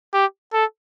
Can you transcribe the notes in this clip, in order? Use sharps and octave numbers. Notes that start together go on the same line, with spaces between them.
G4
A4